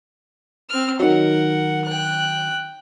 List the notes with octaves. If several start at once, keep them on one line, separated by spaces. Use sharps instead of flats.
C4 F6
D#3 F#3 A#4 F#5
G5 F#6